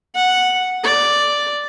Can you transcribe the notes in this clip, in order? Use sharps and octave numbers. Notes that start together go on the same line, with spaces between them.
F#5
D5